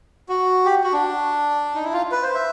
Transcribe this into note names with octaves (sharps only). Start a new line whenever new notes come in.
F#4
G4
F#4
D4
D#4
E4
F4
B4
C5
E5